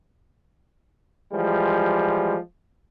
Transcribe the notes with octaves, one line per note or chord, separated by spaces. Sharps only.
E3 F3 G3 G#3